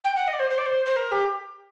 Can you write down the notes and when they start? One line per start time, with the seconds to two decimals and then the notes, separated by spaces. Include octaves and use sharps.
0.04 G5
0.15 F#5
0.27 D#5
0.33 D5
0.39 C5
0.50 C5
0.57 D5
0.65 C5
0.85 C5
0.96 A#4
1.11 G4